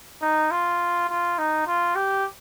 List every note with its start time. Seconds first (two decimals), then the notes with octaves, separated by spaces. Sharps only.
0.22 D#4
0.51 F4
1.09 F4
1.38 D#4
1.67 F4
1.95 G4